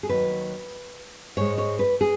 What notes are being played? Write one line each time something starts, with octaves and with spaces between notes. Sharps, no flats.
G#4
D#2 D#3 F#3 B4
G#2 G#3 C#5
C#5
B4
G#4